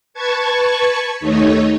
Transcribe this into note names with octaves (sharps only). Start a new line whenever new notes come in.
B4 A5 C#6 G#6
D#2 A3 D#4 C#5